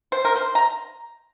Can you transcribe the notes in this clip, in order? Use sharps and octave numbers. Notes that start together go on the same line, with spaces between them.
C5
A#4
C5
A#5